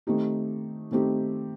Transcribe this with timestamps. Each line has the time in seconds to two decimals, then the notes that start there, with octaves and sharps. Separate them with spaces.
0.07 D#3 A3 C4 D#4 G4
0.91 D#3 A3 C4 D#4 G4